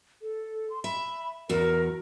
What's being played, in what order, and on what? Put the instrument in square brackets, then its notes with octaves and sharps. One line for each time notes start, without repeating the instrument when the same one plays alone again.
[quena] A4
C6
[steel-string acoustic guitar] E5 [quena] B5
[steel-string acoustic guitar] E2 F#4 [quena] A#4